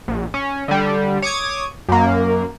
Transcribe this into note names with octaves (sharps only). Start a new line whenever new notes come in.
A#1
C#4
D3 G3
C#5 D6 D#6 G#6
F#2 A#3